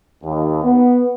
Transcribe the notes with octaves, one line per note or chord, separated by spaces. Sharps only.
D#2
B3